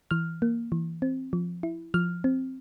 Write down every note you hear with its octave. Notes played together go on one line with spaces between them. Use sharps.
E3 F6
A#3
E3
C4
F3
E4
F3 F6
C4